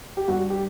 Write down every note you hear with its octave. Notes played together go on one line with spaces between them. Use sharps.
G4
G2 F#4
G4